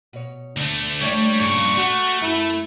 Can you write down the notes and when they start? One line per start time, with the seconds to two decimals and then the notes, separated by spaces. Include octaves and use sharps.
0.13 B2 C#5
0.57 D2 A3 D4
1.01 D2 G3 A3 C#5 D5
1.40 G2 A#2 C#3 C#6
1.77 A3 F#4
2.21 F#2 E4